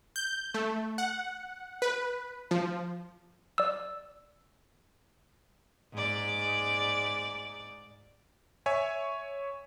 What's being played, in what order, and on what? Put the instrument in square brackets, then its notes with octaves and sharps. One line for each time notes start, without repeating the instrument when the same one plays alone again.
[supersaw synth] G6
A3
F#5
B4
F3
[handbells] D5 E6
[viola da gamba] G#2 D5
[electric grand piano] C#5 E5 G#5